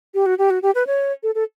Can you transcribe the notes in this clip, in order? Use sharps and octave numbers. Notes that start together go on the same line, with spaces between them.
G4
F#4
G4
F#4
G4
B4
C#5
A4
A4